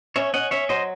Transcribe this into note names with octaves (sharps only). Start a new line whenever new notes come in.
C#4 C#5 E5
C#4 D#5 F#5
C#4 C#5 E5
F#3 C5 D#5